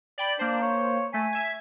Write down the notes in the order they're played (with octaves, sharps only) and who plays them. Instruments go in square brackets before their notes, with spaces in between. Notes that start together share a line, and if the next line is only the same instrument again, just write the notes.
[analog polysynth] D5 G5 B5
[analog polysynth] A#3 C5 [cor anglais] D4
[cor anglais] C#5
[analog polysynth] A3 B6 [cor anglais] G#5
[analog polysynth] E5 G#6